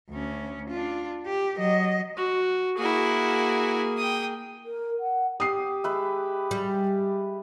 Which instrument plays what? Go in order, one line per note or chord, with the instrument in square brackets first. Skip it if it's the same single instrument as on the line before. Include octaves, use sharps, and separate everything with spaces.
[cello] D2 C#4
D4 F4
G4
F#3 D#5
[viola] F#4
[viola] A#3 G#4 [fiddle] E4 F#4
[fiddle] G5 D#6
[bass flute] A#4
F#5
[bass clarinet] G4 [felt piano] D#6 C7
[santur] G#3 B4 E5
[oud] G3